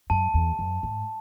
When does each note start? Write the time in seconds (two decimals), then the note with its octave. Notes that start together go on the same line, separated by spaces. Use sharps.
0.10 F#2 A5
0.34 E2
0.59 F#2
0.83 G#2